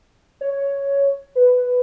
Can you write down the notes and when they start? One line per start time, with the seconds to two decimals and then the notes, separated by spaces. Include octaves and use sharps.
0.41 C#5
1.35 B4